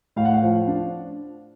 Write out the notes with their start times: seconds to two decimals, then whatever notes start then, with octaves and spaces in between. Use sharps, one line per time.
0.16 A2 F5
0.25 F#5
0.33 F5
0.43 F3
0.67 D4